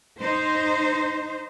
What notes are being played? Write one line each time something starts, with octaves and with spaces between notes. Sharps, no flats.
D#4 C5